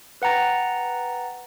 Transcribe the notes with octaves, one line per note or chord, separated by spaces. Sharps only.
B4 F#5 G5 A#5 A6